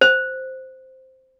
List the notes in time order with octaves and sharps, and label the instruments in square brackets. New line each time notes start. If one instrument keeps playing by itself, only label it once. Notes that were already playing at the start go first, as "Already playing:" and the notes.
[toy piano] C5